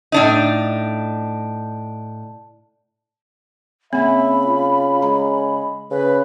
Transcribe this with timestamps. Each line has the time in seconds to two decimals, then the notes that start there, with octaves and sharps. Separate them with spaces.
0.12 A2 D4 D#4
3.93 C#3 A#3 C4 E5 B5
4.44 F4
5.02 G#3 A#5
5.91 C#3 B4